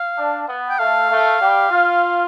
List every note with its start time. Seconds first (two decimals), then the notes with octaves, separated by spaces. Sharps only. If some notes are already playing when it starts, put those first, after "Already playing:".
Already playing: F5
0.18 D4
0.48 B3
0.69 G5
0.79 A3 F5
1.10 A3
1.40 G3 G4
1.70 F4